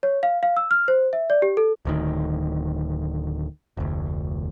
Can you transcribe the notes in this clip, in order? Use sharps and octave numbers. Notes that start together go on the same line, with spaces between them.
C#5
F5
F5
E6
F6
C5
E5
D5
G4
A4
D1 D2 D#3
F1 D2